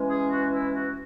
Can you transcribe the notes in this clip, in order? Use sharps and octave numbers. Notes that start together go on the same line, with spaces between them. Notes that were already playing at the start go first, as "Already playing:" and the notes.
Already playing: E3 G#3 C#4
G#4
F#4
E4
F#4